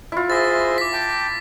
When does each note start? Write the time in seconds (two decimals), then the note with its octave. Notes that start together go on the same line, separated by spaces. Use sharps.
0.12 E4 F4
0.30 G#4 C5 E5 A6 A#6
0.78 D6 B6
0.93 G5 A5